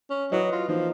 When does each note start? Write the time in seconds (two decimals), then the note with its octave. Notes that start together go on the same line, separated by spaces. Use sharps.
0.10 C#4
0.32 F#3 E4 B4 D#5
0.52 F4
0.68 E3 F3 A#3 D#4